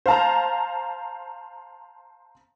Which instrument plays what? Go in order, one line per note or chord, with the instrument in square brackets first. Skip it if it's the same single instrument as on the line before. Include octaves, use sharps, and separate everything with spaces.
[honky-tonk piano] C5 F5 A5 A#5